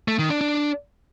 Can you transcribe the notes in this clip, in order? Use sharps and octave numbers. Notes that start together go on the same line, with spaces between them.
A3
D#3
D4
D4